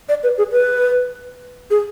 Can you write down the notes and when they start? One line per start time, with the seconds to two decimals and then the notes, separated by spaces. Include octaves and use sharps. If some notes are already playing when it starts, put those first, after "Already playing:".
0.09 D5
0.23 B4
0.38 G#4
0.52 B4
1.70 G#4